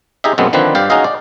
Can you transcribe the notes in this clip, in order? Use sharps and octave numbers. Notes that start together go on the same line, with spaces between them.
D#4 G4 G#4 D#5 E5
F#2 B2 G#3 A3 B3 C4
D3 D#3 F3 C4 D4 B4
G2 G4 D5 F5
C#4 D#4 F#4 G#4 D#5 F5
D5